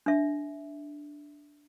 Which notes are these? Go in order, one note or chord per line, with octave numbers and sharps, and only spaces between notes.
D4 E5